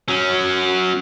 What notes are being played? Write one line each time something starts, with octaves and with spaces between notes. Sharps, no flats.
F#3 C#4